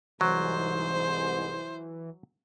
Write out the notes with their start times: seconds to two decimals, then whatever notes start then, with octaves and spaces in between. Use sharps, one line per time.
0.21 C2 G#2 E3 F#3 C5